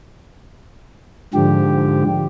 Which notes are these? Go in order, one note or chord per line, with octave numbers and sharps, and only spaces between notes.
G#2 D3 F3 G4